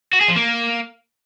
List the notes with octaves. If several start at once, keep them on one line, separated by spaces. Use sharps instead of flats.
F#4
G#4
F3
A#3